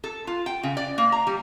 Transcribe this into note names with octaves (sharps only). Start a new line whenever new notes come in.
A4
F4
G5
C#3
D5
A#3
A#5
G3